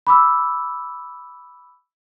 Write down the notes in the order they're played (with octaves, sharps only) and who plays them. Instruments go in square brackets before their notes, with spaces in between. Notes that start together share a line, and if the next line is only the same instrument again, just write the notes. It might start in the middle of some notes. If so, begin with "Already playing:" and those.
[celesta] B5 D6 E6